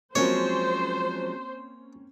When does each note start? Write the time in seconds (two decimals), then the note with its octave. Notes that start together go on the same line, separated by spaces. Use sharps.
0.15 F3 F#3 G#3 A#3 C4 C#4 C5 C#5